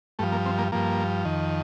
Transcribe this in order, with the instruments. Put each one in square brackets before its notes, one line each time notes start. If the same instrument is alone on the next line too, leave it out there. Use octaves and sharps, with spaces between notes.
[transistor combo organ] G2 F3 A3
A#3
C4
A#3
G2 F3 A#3
F2 D#3